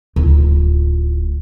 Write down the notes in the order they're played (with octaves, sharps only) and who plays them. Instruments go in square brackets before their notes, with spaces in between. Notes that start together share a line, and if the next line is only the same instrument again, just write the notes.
[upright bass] D1 F4